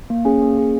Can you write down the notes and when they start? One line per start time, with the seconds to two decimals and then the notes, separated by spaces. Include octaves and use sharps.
0.10 A#3
0.25 C#4 G#4
0.42 A#3
0.58 C#4 G#4